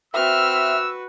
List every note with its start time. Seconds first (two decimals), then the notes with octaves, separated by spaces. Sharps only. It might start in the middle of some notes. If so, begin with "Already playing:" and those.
0.14 C4 F#4 B4 E5 E6 F6